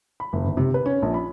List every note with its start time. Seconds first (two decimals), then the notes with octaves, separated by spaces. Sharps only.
0.20 B5
0.33 F#1
0.45 G1
0.57 C3
0.74 B4
0.86 C#4
1.02 A#1
1.14 B5